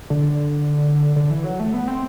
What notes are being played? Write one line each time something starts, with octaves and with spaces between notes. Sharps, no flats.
D3
D3
E3
F#3
A3
B3
C4